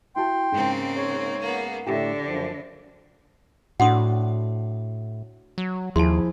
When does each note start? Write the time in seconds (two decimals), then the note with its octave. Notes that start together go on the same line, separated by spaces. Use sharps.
0.16 E4 F#4 G5 A5 C6
0.52 G#2 C#3 A#3 C4
0.97 C#5
1.39 A#3 B3
1.87 A2 D3 A3 G4 D5 E5
2.26 F#2 F3
3.80 A2 D4 F#4 F#5 C6 D#6
5.58 F#3
5.96 D#2 F3 E4 G#4 A5 C6